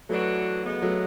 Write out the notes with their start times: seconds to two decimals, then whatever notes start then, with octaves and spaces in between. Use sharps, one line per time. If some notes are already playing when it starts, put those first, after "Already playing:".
0.09 E3 F#3 A3 B3 D4 F#4
0.64 E2 C#3 G#3 B3
0.82 F#3 A3